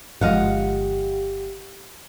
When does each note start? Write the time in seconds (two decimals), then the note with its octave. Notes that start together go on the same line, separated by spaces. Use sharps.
0.21 G1 F3 G#3 G4 D#5 F5 F#5